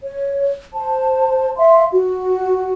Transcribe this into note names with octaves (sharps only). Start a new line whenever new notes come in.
C#5
C5 A5
E5 F5 C6
F#4